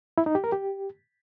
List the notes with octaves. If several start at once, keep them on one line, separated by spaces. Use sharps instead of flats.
E4
D#4
G4
A#4
G4